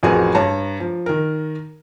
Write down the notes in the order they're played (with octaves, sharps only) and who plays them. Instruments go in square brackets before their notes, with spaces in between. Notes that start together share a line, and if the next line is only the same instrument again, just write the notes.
[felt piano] A1 F2 F#4 G#4 A#4
G2 C#5 A5 A#5
F3
D#3 A#4